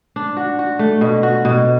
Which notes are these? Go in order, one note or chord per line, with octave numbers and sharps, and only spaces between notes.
D4
F#4
F#4
A3
B2
F#4
B2